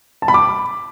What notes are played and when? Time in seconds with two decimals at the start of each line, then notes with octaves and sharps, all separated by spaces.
0.22 A5
0.28 B5
0.34 D6